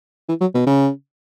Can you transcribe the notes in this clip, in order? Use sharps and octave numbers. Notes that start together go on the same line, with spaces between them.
E3
F#3
B2
C#3